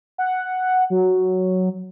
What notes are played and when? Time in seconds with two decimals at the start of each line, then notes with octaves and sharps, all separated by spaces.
0.18 F#5
0.90 F#3